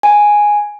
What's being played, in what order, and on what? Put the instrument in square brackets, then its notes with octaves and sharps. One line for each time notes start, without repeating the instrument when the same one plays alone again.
[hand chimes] G#5